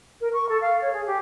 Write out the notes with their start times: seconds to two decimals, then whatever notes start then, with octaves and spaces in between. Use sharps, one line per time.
0.21 A#4
0.33 C#6
0.49 A4
0.61 F5
0.81 C#5
0.93 G#4
1.06 G4